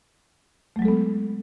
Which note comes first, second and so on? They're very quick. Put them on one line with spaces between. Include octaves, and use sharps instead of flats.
A3 F#3 G#3 A4 B3